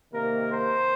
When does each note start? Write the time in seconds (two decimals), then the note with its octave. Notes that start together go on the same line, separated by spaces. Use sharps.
0.12 C3 D#3 A#3 A#4
0.51 C5